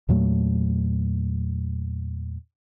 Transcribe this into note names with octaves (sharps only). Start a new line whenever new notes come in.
E2 A#2 F#3 A3